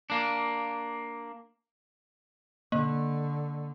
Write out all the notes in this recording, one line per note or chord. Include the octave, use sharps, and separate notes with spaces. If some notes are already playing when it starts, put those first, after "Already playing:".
A#3 D4
D3 A#3